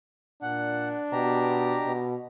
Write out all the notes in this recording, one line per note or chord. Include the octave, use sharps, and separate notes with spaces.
A#2 D4 F#5
B2 G4 A#5
B2